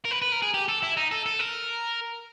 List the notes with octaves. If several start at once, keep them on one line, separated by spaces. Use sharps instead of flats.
A#4
B4
B4
A#4
G#4
G4
A4
E4
D#4
A4
A4
A#4